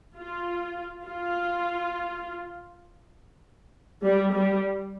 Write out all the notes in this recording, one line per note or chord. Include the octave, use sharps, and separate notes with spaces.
F4
F4
G3
G3